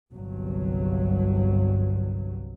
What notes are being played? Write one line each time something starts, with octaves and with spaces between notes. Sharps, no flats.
G1 C2 G2 F#3